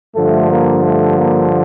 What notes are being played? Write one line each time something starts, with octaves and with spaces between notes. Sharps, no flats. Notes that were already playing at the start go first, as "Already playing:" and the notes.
G2 D3 F3 A3
A#3
A3
A#3